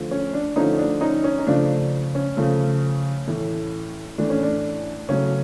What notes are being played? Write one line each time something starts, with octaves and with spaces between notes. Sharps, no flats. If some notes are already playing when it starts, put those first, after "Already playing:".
Already playing: D3 F3 A3
C#4
D4
D3 F3 A3 C#4 D#4
D4
C#4 D#4
C#4
D#4
C#3 F3 A3 D4
C#4
C#3 F3 A3
A2 E3 A3
A2 E3 A3 D4
C#4
D4
C#3 F#3 A3 C#4